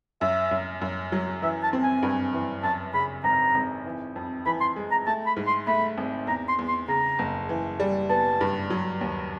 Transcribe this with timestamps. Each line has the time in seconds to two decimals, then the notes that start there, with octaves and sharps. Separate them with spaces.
0.21 F#2 E5
0.51 F#2
0.81 F#2
1.12 F#3
1.42 E3 E5
1.63 A5
1.73 C4
1.83 G#5
2.03 G2
2.33 E3
2.63 F#2 A5
2.94 C#3 B5
3.24 G#1 A#5
3.55 G#1
3.85 E3
4.16 F2
4.46 E3 B5
4.61 C6
4.76 G#3
4.91 A#5
5.07 A3 A5
5.26 B5
5.37 G#2
5.47 C6
5.67 A3 B5
5.98 G#1
6.27 E2 A#5
6.48 C6
6.59 E2
6.68 C6
6.88 C#3 A#5
7.19 F#1
7.49 E3
7.80 G3
8.10 B3 A5
8.41 G2
8.70 F#3
9.01 D#2